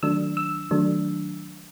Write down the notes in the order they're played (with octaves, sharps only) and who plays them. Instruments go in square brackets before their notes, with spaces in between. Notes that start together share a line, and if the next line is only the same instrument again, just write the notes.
[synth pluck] D#3 F#3 A3 D4 E6
E6
D#3 F#3 A3 D4